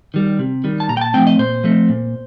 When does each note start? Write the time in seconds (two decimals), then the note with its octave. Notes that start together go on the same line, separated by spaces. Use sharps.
0.14 D#3 G3
0.39 C3
0.64 D#3 G3
0.80 A5
0.89 A#2 A#5
0.97 G5
1.01 A5
1.14 F3 A3 C4 G5
1.27 D#5
1.38 A#2 C5
1.64 F3 A3 C4
1.89 A#2